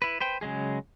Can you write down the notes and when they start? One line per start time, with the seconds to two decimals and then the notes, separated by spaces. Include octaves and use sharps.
0.02 E4 B4
0.20 B4 C5 G5
0.41 C#3 F#3 G#3 G#4